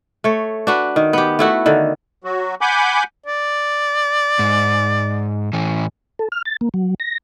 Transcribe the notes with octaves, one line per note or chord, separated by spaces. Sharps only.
A3 C#5
D4 F#4 B4
D#3
B3 G4
A3 E4 F#4
D3 D#3
F#3 F#4
F#5 G#5 B5 D6 G6
D5
G#2
A2 E3
A4
F6
A6
A#3
F#3
A#6